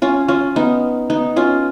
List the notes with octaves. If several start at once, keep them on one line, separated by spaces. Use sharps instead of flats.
C#4 F4
C#4 F4
B3 D#4
B3 D#4
C#4 F4